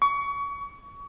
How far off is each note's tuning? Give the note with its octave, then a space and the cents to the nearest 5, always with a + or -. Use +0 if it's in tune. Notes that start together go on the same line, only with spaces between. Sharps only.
C#6 +30